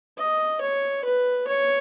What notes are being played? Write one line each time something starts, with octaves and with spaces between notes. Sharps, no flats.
D#5
C#5
B4
C#5